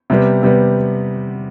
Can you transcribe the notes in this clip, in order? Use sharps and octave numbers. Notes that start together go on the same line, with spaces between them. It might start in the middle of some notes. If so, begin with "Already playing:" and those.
C3 G3 B3
C3 G3 B3